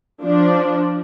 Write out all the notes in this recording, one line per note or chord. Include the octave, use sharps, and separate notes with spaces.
F3 D4